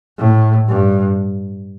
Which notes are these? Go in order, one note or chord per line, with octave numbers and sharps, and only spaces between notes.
A2
G2